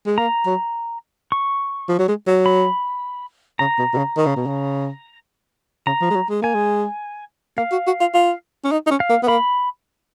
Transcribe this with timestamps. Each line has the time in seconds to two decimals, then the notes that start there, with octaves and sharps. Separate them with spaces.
0.06 G#3
0.18 A#3 A#5
0.46 F#3
1.32 C#6
1.88 F3
1.99 F#3
2.08 G#3
2.27 F#3
2.46 B5
3.59 C#3 A#5
3.78 B2
3.93 B2
3.97 C#3
4.16 D#3
4.26 C#3
4.36 B2
4.46 C#3
5.87 C#3 A#5
6.01 F3
6.10 G#3
6.15 F#3
6.29 G#3
6.42 A#3 G#5
6.54 G#3
7.57 A#3 F5
7.71 F#4
7.86 F#4
8.00 F4
8.14 F4
8.64 C#4
8.72 D#4
8.87 D#4
8.90 C#4
9.00 F5
9.09 A#3
9.23 B3
9.28 A#3 B5